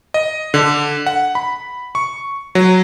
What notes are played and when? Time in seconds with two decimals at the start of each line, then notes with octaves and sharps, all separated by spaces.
0.14 D#5
0.54 D3
1.06 F#5
1.35 B5
1.95 C#6
2.55 F#3